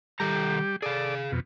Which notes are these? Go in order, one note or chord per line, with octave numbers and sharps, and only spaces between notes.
D#3 G3 G4 A4 A#5
G#4 A4 D5 F5
F2 B2